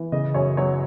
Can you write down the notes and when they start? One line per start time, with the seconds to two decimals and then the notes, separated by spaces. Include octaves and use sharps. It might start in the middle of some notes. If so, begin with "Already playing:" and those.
Already playing: E3
0.12 C#3 D#5
0.34 F#2 C#5
0.57 F#3 C#5